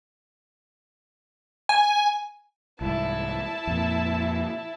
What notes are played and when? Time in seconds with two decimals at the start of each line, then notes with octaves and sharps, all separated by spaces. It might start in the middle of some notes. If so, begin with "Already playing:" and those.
1.69 G#5
2.81 C2 G#2 E4 A5
3.67 F2 A#2